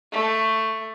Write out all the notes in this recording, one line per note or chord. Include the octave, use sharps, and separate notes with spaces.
A3